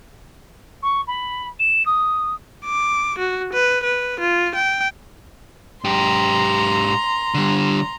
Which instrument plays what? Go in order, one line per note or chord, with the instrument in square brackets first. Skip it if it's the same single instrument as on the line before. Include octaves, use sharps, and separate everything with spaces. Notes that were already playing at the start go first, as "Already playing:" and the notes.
[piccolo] C#6
B5
E7
D#6
[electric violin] D6
F#4
B4
B4
F4
G5
[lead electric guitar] G#2 G4 [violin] A#5 C6
[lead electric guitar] D3 G3